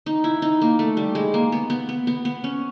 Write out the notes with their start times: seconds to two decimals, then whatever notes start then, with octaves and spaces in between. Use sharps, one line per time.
0.06 D#4
0.24 E4
0.42 D#4
0.62 A#3
0.79 A3
0.97 G3
1.15 G#3
1.34 A#3
1.52 B3
1.70 B3
1.89 B3
2.07 B3
2.25 B3
2.44 C#4